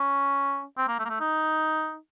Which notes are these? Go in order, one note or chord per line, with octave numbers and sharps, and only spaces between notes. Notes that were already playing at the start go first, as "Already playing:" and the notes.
Already playing: C#4
C4
A#3
A3
A#3
A3
D#4